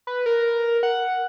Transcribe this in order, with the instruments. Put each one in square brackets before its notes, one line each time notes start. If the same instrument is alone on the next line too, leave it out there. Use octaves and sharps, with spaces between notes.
[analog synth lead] B4
A#4
F#5